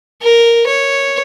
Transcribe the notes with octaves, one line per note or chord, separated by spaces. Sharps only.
A#4
C#5